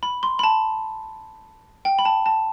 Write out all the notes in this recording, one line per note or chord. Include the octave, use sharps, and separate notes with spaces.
B5
C6
B5
A5
G5
B5
A5
A5